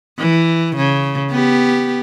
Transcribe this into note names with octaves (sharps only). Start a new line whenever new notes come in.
E3
C#3
B3 G4